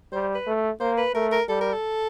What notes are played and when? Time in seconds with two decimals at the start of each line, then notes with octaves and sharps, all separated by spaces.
0.12 G3 C5
0.35 B4
0.46 A3
0.80 A#3 C5
0.98 B4
1.14 A3 A#4
1.32 A#4
1.48 G3 A4
1.61 A#4
1.73 A4